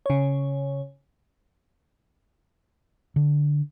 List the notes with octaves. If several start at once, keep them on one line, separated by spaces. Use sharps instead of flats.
C#3 C#5
D3